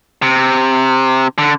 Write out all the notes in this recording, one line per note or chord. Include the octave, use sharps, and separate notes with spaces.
C3
D3